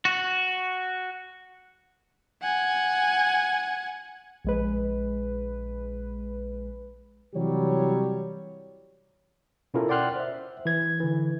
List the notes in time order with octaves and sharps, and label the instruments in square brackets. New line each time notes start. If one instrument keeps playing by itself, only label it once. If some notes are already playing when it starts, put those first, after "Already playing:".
[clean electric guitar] F#4
[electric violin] F#5 G#5
[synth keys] A#1 G#3 B4
[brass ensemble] C3 E3 F#3 G3 G4 C#5
[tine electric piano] B2 C#4 E4 F4 A4 A#4
D5 F#5 G5 C6 F6 F#6
C5 E5
E3 G#6
D3 E3